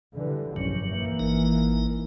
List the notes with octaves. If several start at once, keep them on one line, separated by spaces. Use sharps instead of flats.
D3 E3 G3
F1 A#1 G2 F#3 C#4
E3 A#3
G#1 D#4 A#4